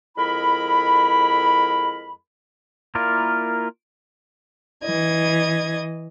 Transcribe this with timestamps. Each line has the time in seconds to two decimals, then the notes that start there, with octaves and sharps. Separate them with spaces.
0.18 F2 G#3 E4 A#4 B5
2.95 A#3 E4 F4 A#4 D5
4.84 E3 D#5 G#6